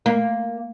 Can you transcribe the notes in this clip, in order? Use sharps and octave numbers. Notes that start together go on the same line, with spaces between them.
A#3